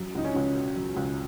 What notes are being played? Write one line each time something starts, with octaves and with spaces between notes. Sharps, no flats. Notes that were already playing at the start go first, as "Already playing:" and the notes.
Already playing: F#2 F#3
C#2 D#4
C#4
C#2
B2
F#3
C#2